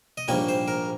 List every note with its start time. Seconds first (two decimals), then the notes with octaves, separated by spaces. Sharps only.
0.17 D#5
0.28 A#1 G#2 G3 A#3 C#5
0.49 C5
0.68 A#4